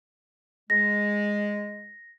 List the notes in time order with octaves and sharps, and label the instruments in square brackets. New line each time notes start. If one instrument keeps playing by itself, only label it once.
[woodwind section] G#3 [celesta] A#6